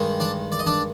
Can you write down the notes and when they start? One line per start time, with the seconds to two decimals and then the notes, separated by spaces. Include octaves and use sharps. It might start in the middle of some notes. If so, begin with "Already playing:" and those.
Already playing: G2 D#3 G#3
0.20 D4 D5
0.52 D5
0.59 D#5
0.66 D4 D5